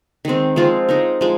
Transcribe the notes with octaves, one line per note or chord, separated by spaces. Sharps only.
D#3 G#3 C4
F3 G#3 C4 F4
G#3 D#4 A#4
F3 G#3